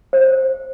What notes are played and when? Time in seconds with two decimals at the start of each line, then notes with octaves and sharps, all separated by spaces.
0.13 C5